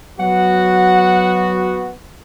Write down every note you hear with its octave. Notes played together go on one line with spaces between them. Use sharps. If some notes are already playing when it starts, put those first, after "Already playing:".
F#3 B3 F#4 F#5